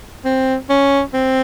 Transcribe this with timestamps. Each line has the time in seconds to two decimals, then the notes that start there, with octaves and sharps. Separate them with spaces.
0.25 C4
0.70 C#4
1.14 C4